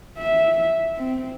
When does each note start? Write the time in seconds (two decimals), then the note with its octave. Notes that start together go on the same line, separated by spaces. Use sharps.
0.18 E5
0.97 C4